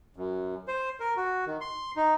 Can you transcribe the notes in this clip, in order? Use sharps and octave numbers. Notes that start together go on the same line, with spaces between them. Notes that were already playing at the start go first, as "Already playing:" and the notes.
F#2
C5
A#4
F#4
D#3
C6
D#4